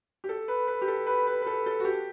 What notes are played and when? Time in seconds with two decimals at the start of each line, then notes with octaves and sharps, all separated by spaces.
0.24 G4
0.29 A4
0.48 B4
0.67 B4
0.82 G4
0.88 A4
1.07 B4
1.27 B4
1.42 B4
1.47 A4
1.66 A4
1.80 F#4
1.85 G4